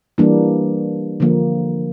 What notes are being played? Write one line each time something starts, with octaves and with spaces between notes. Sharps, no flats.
E3 G3 A#3 D4
D3 F3 A#3